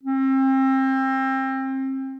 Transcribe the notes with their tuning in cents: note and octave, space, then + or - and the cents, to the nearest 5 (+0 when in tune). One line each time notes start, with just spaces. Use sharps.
C4 +30